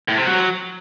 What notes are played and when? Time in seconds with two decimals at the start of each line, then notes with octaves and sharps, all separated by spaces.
0.08 A2
0.17 C3
0.27 F#3